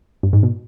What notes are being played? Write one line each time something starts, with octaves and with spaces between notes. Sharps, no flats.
G2
G#2
B2